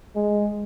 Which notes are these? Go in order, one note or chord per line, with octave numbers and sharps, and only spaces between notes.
G#3